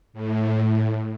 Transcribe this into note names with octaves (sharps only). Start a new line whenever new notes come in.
A2